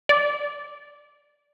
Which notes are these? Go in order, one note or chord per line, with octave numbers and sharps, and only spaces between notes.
D5